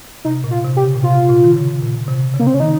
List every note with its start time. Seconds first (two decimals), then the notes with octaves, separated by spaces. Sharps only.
0.25 C3 D#4
0.44 A#2
0.51 F4
0.64 C3
0.77 G4
0.84 C#3
0.94 A#2
1.03 C3 F4
1.29 A#2
1.44 D#3
1.56 C#3
1.82 A#2
2.08 C3
2.34 C#3
2.39 A#3
2.47 C4
2.54 C#4
2.60 D#3 D#4